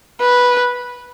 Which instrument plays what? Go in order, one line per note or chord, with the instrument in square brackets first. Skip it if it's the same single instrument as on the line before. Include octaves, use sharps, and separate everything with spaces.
[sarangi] B4